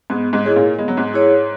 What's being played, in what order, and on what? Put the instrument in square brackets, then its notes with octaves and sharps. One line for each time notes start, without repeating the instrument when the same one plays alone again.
[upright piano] G#2 G#3 [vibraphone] B3
[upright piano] G#2 G#3
[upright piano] G#3 [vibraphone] E4 G#4 C#5
[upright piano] A#2 A#3
[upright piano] G#3 [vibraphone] B3
[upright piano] F#3
G#2 G#3
[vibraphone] E4 G#4 C#5